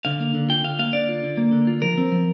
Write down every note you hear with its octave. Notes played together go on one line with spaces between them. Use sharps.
D3 F5
A#3
D3
F4 G5
D3 F5
A#3 F5
D3 D5
F4
D3
A#3
D3
F4
F3 A#4
C4
F3